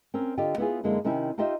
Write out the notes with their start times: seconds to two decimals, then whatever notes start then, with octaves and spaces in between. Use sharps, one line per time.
0.14 C4 C#4 A#4
0.37 D3 F4 G4 D#5
0.58 B3 E4 F4 G#4
0.83 F#2 D3 G#3 A#3 E4
1.04 C3 D#3 C4 C#4 E4
1.38 D#4 F4 G4 C5 D#5 E5